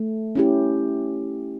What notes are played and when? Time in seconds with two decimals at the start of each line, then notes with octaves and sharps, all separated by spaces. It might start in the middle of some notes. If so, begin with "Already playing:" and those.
Already playing: A3
0.35 C#4 E4 G4